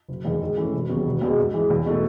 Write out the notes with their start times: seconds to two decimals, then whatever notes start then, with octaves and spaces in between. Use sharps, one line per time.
0.08 F#1
0.25 E2 D#3 G#3
0.41 G#2
0.57 E3 A3 C#4
0.74 E1
0.89 D#2 C#3 F#3 B3
1.06 E1
1.21 E2 B2 G#3
1.38 G#2
1.54 E3 G#3
1.70 E2
1.86 B2 A3